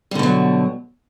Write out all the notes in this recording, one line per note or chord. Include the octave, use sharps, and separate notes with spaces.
B2 D3 F#3 G3